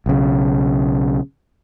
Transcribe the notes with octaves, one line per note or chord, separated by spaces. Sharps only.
B1 C#3